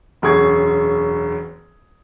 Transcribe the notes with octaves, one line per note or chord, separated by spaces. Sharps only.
E1 F#2 G#4 C#6 G#6